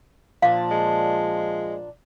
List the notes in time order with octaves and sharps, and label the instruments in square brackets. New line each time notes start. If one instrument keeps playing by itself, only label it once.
[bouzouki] A#2 D4 [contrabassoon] F3 [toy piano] F5
[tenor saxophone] G#3